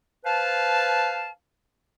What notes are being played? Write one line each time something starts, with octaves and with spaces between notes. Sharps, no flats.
B4 C5 F5 A5